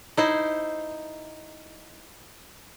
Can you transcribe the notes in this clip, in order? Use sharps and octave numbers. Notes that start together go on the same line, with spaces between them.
D#4 E4 C5